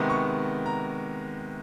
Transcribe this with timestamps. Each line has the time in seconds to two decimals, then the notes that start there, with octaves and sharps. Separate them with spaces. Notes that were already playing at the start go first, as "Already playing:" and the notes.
Already playing: C3 D#3 G#3 B3
0.10 C#6
0.66 A#5